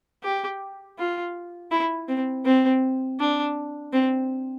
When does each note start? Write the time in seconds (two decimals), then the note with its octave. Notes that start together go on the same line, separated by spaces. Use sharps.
0.24 G4
0.98 F4
1.71 E4
2.08 C4
2.45 C4
3.20 D4
3.93 C4